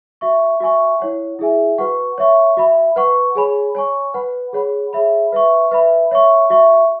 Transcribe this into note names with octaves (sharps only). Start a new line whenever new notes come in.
F#4 E5 C#6
F#4 E5 G#5 C#6
E4 C#5 F#5
E4 G#4 E5 G#5
F#4 B4 F#5 C#6
C#5 E5 C#6
F#4 E5 B5
B4 F#5 C#6
G#4 C#5 G#5 B5
C#5 G#5 C#6
B4 F#5 B5
G#4 C#5 F#5 B5
G#4 C#5 E5 B5
B4 E5 C#6
B4 E5 B5
C#5 E5 C#6
F#4 E5 C#6